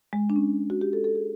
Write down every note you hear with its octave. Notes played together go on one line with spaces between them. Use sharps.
G#3
D4
C#4
F#4
G4
A4
A4
G#4